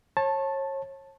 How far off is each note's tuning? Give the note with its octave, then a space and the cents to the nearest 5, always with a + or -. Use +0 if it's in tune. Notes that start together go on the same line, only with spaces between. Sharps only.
C#5 -35 A5 +0